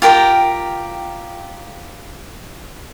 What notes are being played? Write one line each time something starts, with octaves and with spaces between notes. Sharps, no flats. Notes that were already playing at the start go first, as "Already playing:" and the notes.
F4 G4 A#4 G5